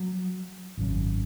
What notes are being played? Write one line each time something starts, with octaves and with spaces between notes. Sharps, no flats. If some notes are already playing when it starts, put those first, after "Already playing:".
Already playing: F#3
G#1 F#2 C#3